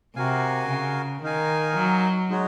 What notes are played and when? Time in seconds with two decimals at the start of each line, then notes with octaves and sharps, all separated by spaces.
0.16 C3 F#4 A#4 F5 G#5
0.69 C#3
1.23 D#3 D#4 A#4 F5 G#5
1.76 F#3
2.29 G#3 D#4 F#4 C#5